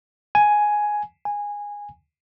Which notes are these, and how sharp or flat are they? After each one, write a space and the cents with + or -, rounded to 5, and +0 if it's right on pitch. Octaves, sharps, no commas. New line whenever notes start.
G#5 +5
G#5 -15